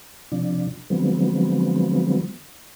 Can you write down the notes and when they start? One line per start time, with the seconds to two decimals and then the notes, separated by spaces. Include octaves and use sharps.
0.32 C3 F3 D4
0.90 D3 F3 F#3 G#3 B3 C4